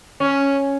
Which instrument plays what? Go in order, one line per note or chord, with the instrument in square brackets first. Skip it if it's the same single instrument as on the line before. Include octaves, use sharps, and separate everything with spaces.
[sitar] C#4